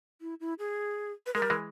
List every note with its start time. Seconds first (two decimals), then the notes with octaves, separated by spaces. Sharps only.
0.21 E4
0.40 E4
0.59 G#4
1.26 B4
1.35 G#3 A#4
1.42 G3
1.50 E3 G#3